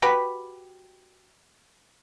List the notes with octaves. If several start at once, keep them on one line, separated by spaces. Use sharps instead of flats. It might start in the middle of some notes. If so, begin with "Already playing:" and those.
F#4 G4 B4 B5